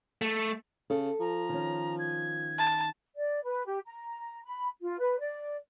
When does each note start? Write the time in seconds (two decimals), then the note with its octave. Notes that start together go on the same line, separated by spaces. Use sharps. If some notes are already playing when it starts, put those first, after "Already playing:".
0.22 A3
0.90 C#3 A4
1.20 F3 A#5
1.49 D#3 C#4
1.99 G#6
2.59 A5
3.16 D5
3.44 B4
3.66 G4
3.87 A#5
4.45 B5
4.81 F4
4.99 B4
5.19 D5